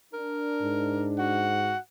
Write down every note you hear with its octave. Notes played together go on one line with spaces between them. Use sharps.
D4 A#4
G#2
F#4 F#5